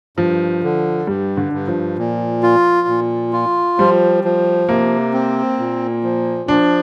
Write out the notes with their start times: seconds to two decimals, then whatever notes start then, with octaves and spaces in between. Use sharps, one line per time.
0.17 G2 F3
0.63 D3
1.07 G2 G3
1.37 D3
1.53 G2
1.68 F3
1.98 A#2
2.43 F4
2.88 A#2
3.33 F4
3.78 F3 G3
4.24 F3
4.69 C3 A#3
5.13 C4
5.59 A#2
6.03 F3
6.48 F3 D4